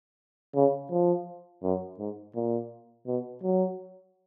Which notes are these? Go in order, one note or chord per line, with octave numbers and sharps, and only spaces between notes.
C#3
F3
F#2
G#2
A#2
B2
F#3